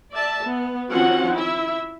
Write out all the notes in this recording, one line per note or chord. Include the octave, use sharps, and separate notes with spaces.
D5 E5 A5
B3
D#3 F3 C4 C#4 F#4 F#5
E4 E5